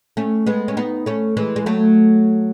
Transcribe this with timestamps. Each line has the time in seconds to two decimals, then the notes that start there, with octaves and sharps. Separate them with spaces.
0.17 A3 C#4
0.47 G#3 B3
0.68 C#4
0.77 B3 D#4
1.06 A3 C#4
1.37 E3 G#3
1.56 G#3
1.66 F#3 A3